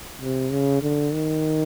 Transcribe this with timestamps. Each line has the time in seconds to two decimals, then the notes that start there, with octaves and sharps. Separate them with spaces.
0.22 C3
0.52 C#3
0.82 D3
1.13 D#3